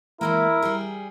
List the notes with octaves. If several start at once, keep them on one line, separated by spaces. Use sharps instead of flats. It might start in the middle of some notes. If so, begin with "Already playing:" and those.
E3 G#3 A#3 E4 A#4
G3 G#4